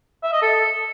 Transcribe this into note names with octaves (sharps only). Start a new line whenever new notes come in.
E5
D#5
A4